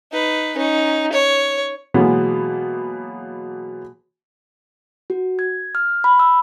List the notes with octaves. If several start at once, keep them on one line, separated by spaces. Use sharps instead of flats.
D#4 B4
C#4 D#4
C#5
B2 E3 F#3 G#3 A#3 B3
F#4
G#6
F6
B5
E6